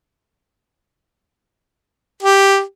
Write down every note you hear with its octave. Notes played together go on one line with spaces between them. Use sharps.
G4